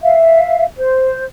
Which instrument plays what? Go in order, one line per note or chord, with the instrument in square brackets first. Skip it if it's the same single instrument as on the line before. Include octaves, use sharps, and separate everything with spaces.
[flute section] E5 F5
C5